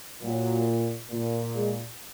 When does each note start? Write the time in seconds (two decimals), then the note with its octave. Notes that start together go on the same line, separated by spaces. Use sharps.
0.23 A#2 F#3
1.11 A#2
1.55 G#3